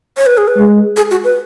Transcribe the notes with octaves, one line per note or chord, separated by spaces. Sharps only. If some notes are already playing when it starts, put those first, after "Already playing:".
C#5
B4
G#4
B4
G#3
G#4
F#4
B4